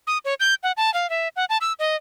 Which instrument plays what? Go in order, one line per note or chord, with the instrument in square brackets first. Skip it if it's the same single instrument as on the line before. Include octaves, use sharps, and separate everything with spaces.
[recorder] D#6
C#5
G6
F#5
A5
F5
E5
F#5
A5
E6
D#5